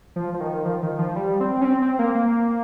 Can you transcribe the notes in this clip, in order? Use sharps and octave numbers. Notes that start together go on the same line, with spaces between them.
F3
F3
D#3
F3
D#3
F3
G3
C4
C#4
C4
C4
A#3
A#3